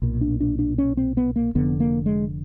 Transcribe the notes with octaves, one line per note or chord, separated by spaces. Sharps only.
B1 A#2
D4
D4
D4
C#4
C4
B3
A#3
F1 F2 D3 B3
A#3
G#3